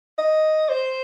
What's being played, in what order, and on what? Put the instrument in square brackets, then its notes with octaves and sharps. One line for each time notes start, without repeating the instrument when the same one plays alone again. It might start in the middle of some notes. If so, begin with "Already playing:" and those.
[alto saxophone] D#5
C5